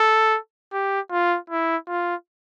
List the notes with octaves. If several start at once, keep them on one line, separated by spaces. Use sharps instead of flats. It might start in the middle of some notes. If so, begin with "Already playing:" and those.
Already playing: A4
G4
F4
E4
F4